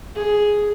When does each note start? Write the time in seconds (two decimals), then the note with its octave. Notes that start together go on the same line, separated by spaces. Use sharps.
0.15 G#4